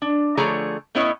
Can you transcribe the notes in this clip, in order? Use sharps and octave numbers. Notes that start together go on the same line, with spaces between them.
D4
D3 F3 A3 G#4 C#5 A#5
A2 B3 C#4 E4 C#5 D#5